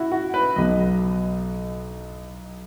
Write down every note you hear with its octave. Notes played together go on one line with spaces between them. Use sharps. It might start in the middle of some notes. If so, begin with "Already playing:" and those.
Already playing: E4 F#4
F#4
B4
B1 B2 F#3 D#5